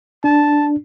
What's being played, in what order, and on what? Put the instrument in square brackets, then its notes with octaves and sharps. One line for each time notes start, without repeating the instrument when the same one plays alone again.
[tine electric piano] D4 [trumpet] A5